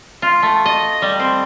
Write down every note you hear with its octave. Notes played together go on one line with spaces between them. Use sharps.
F4
A3
D#5
G3
C4